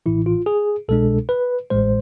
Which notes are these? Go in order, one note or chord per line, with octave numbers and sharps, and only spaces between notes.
A1 A2 E3 E4
F4
G#4
C2 B2 G#3 D4 A4
B4
A1 A2 G#3 C5